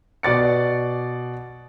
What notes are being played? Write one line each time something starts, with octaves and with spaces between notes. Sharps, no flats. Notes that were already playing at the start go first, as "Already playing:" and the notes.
B2 D5 A6 C#7